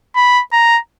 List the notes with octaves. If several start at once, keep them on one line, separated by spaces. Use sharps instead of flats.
B5
A#5